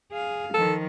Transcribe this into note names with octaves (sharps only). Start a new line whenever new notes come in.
G#4 F5
D#3 F3 A4